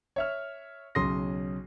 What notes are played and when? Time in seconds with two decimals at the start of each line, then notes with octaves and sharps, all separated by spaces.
0.16 C#5 E5 F6
0.95 B1 C#3 C6 D#6 A#6